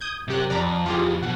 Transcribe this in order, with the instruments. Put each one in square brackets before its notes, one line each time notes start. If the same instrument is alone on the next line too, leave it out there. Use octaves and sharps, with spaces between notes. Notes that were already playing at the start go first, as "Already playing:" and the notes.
[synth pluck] D#6 G6 G#6
[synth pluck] F#2 G4 F#6 [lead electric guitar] C3
[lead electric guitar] F2 [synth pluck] D5 A#5 B5
[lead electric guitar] F2 E3 [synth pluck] F4 G4 G#4
[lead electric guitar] B2 F3 [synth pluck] F#5